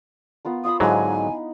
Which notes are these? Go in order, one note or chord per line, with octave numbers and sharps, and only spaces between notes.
B3 F4 A#4
F4 E5 B5 D#6
G#2 D3 F#3 D#4 E4 G#5